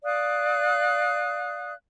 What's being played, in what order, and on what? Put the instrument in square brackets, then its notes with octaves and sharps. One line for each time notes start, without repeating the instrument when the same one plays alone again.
[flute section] D5 F5 D#6 F#6